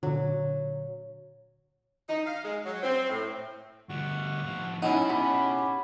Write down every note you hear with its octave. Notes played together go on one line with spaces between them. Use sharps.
A#2 D3 F#3
D#4
F5
G#3
F#3
C4
A2
D2 G3 F#5 C#6
A2 F3
B2 F#3 C#4 D#4 E4 F#5
C#4 G4 A5 B5